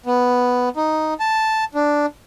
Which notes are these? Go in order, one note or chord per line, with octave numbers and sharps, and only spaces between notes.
B3
D#4
A5
D4